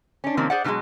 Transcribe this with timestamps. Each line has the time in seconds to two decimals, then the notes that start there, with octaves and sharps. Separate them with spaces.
0.24 C#4 D4
0.37 C3 D#3 F3 A#3 C4 C#4
0.50 G#4 C5 D5 F#5
0.64 B2 D#3 F3 F#3 G#3